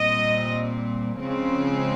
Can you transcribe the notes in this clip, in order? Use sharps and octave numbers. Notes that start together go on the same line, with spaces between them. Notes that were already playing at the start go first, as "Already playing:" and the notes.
Already playing: A#2 G3 C4 D#5
C#3 F3 G#3 C4